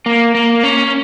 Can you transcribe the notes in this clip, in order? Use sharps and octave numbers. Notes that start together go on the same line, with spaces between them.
A#3
A#3
C#4